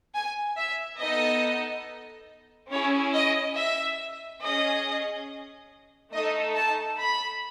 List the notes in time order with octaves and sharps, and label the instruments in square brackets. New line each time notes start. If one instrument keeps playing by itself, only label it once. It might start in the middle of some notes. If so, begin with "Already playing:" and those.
[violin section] G#5
E5
B3 D#4 A4 D#5
C#4 E4 G#4 C#5
D#5
E5
C#4 G#4 D#5
A3 D#4 A4 D#5
A5
B5